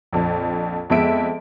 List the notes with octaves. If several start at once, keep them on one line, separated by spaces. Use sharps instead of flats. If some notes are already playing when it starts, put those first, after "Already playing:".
A#1 F2
F2 G#3 B3 E5 D7